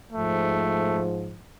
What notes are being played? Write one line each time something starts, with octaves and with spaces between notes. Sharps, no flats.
G#2 F3 A3